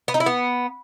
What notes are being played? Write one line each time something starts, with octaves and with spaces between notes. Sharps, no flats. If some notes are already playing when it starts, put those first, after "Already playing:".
B3
D#4
E4
B3